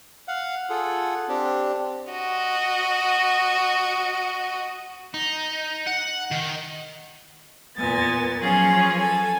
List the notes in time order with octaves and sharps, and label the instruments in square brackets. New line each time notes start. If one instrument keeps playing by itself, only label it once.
[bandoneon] F5 F#5
F4 G#4 A4 F#5
C4 D4 G4
[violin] F#4 D#5
[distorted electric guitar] D#4
F#5
D#3
[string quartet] E2 A#2 B3 G#5 A6
F3 F#3 C#4 F4 G#4
A4 G#5